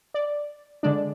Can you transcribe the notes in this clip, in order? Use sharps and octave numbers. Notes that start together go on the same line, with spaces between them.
D5
D3 G#3 D4 D5